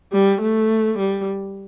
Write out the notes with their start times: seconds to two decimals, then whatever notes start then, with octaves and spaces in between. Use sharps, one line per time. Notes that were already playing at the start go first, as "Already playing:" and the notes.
0.13 G3
0.41 A3
0.99 G3